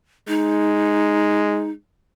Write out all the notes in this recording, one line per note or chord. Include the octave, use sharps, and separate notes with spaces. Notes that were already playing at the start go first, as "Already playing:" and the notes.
G#3 D#4